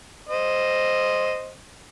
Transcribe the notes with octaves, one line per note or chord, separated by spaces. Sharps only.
C5 D#5